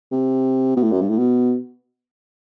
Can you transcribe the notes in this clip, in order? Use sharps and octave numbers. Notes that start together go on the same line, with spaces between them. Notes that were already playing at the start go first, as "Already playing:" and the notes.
C3
B2
A2
F#2
G2
A2
B2